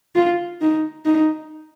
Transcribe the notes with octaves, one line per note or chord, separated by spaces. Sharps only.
F4
D#4
D#4